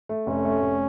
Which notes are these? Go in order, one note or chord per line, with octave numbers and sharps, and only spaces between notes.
A3
F1 C#4
A3
F1